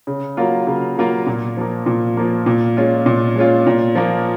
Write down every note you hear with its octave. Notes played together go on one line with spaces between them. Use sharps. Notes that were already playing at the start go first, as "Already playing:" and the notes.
C#3
F#3 A#3 F4
C#3
F#3 A#3 F4
A#2
F3 A#3
A#2
F3 A#3
A#2
G#3 C#4 F4
A#2
G#3 C#4 F4
A#2
F3 A#3